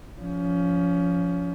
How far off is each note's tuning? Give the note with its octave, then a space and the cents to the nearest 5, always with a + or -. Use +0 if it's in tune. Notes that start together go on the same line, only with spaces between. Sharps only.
F3 +0 C#4 +30